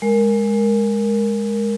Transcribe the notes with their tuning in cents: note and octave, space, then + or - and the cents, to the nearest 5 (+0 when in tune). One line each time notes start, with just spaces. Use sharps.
G#3 +0 A#4 +0